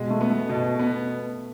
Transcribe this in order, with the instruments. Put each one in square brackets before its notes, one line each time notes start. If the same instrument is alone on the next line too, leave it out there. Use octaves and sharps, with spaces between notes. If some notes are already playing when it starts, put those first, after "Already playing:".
Already playing: [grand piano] B2 [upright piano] G#3
[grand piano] A3
[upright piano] B3
[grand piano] A3
[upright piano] B2
B3